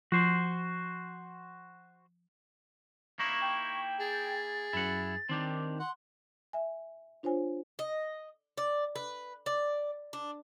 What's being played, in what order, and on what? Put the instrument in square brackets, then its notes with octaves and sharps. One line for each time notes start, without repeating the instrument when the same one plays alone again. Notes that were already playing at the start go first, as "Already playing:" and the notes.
[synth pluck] F3 [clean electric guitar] F#4 C5
[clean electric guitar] A#3 D#4 E4 [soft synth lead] C#6
[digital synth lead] G5
[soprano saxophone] G#4 [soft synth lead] A6
[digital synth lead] F#2 [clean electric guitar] E4 F#5
[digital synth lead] D#3 [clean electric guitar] C4 D4 G4
[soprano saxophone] F#5 [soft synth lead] C6
[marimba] E5 G#5
D4 F4 C5 C#5 G#5
[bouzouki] D#5
D5
B4
D5
D4